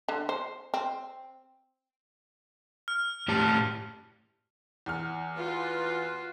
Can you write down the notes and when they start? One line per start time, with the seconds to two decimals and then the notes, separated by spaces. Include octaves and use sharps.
0.09 D3
0.29 C5
0.74 C4
2.88 F6
3.28 A2 G4 A5
4.86 E2 F6
5.37 F4 F#4 B4